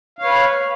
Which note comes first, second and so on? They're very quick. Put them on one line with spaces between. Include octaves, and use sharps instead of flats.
F5 C#5 B4